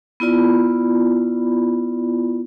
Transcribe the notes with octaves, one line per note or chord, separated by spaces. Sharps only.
B3 E4 F4 D5 B5